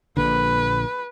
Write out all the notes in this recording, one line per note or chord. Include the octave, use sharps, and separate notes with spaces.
A#1 A#2 D3 B4